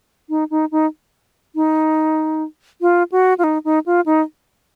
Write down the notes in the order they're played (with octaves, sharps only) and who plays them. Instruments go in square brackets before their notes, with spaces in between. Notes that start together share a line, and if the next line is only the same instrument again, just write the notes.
[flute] D#4
D#4
D#4
D#4
F4
F#4
F4
D#4
D#4
F4
D#4